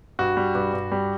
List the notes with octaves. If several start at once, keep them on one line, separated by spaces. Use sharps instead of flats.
G2 F#4
G3
G2
G2
G3